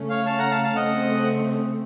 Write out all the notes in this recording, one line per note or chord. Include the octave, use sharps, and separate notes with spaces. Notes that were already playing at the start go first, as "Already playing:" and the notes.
Already playing: C#3 A3 C#4
C#5 F5
F5 A5
F#5 A#5
F5 A5
F5 A5
C#3 A3 C4 D#5 F#5